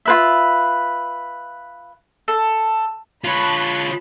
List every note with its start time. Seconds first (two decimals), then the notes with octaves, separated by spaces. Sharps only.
0.05 F4 B4 E5
2.28 A4
3.24 F4 C#5 A5 B5 F#6